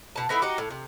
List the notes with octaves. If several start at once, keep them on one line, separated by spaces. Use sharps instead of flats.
B2 A5
A3 B3 D#4 E4
D#4 F#4 G4
A2
C3